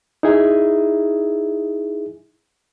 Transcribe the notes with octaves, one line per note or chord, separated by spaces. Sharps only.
D#4 E4 G#4 E5